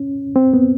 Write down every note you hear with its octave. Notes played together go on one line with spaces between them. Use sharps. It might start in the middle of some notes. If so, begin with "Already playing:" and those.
Already playing: C#4
C4
B3